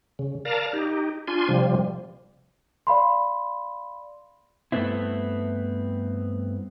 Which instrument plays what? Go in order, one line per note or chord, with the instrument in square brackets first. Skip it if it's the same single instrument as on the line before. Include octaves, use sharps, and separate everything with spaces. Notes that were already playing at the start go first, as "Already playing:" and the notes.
[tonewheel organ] C#3
A#4 D5 F5 A5 A#5
D#4 G4
D4 F4 G#5 C6
C3 F3 G3
[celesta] D5 F5 B5 C6
[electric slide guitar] G2 A3 B3 C4 E4